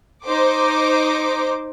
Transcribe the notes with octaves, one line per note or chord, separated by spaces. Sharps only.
D#4 C5 D6